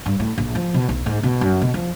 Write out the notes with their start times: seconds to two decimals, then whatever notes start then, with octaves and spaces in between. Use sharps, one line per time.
0.06 G2
0.20 A2
0.38 A#1
0.55 F3
0.74 B2
0.89 B1
1.06 G#2
1.23 B2
1.41 F#2
1.61 B2
1.74 F3